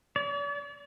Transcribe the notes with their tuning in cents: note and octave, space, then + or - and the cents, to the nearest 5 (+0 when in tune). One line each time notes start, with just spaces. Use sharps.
D5 -45